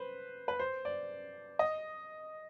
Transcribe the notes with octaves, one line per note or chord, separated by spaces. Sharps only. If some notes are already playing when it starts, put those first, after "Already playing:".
Already playing: B4 C5
B4
C5
D5
D#5